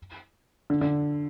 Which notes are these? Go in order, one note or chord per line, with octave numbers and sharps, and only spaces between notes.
D3
D3